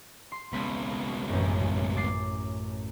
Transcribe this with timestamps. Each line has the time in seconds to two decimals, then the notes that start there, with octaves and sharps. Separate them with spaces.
0.32 C6
0.53 C#2 B2 B5
1.29 A1 F#2
1.96 D6 A6 C7